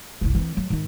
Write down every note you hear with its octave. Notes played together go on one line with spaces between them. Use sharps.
F#1 C2
E3 C4
F#3
G#2 D#3